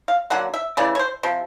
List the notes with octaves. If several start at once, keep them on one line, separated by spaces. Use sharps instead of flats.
F5
D3 F#3 A#3 F#5
E5
C#3 E3 A3 D5
C#5
C5
C3 F3